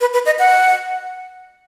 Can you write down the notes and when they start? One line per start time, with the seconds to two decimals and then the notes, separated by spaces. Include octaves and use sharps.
0.01 B4
0.14 B4
0.26 D#5
0.39 F#5